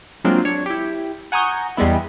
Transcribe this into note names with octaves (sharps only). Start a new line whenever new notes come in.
F#3 G#3 A#3 C4 D4 F4
D4 C#5
E4 G4
F#5 G#5 A#5 C#6 D#6 G6
E2 G3 G#3 B3 E4